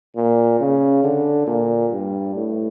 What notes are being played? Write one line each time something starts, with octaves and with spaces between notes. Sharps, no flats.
A#2
C#3
D3
A#2
G2
A2